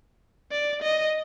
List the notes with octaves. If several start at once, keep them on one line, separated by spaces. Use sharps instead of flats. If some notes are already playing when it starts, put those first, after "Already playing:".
D5
D#5